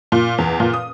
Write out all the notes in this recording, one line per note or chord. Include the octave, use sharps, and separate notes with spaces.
A#2
E2
A#2
D#6